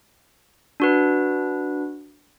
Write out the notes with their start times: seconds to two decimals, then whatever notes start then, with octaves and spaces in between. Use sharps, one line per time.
0.80 D4 F#4 B4